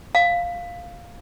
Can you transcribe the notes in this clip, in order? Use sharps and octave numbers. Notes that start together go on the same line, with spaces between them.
F5